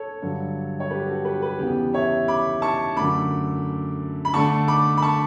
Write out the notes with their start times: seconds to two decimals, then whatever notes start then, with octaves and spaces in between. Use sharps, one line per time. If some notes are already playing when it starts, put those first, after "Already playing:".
Already playing: A4 C#5
0.22 G2 D3 F#3
0.80 C#5
0.90 G4 B4
1.08 F#4 A4
1.25 G4 B4
1.42 G4 B4
1.59 E2 C#3 E3 B3 G4
1.93 C#5 E5
2.28 B5 D6
2.62 A5 C#6
2.96 F#2 D3 A3 B5 D6
4.25 B5
4.34 D3 A3 D4 A5 C#6
4.68 B5 D6
4.97 B5
5.02 A5 C#6